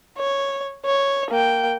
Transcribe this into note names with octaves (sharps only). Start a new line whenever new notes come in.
C#5
C#5
A#3 G5